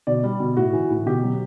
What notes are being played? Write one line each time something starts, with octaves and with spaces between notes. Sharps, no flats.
B2 D5
G3
B2
A2 F#4
E3
A2
B2 G4
F#3